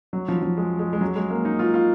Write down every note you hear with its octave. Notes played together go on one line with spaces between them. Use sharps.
F#3
F3
F3
G#3
G#3
G#3
F#3
G#3
A#3
D#4
F4
F4